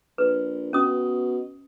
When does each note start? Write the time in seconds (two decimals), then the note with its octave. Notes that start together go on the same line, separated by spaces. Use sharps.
0.18 A#1 B4
0.73 B2 C#4 D#6